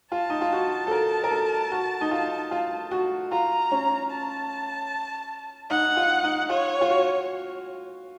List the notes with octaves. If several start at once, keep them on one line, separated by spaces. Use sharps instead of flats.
F4 A5
D#4
F4
F#4
A4
A#4
A#4
A4
F#4
D#4
F4
F4
F#4
F4 A#5
C#4
A5
D#4 F#5
F4
D#4
F4 C#5
F4
F#4